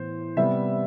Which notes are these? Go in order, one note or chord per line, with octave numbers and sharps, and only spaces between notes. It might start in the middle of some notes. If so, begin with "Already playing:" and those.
Already playing: A2 E3 B3 C5
C3 G3 B3 E5